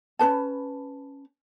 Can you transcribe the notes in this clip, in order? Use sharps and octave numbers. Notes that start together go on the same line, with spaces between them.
C#4 D4 B4 A5